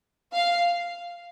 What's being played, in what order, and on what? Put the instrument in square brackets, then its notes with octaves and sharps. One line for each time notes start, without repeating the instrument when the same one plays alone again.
[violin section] F5